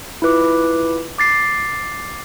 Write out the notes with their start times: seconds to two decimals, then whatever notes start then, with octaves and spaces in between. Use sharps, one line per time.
0.22 E4 F4 B4 D6
1.18 D6 A6 C7